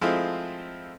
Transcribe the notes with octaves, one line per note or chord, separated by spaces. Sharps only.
F3 G#3 A3 C4 E4 F4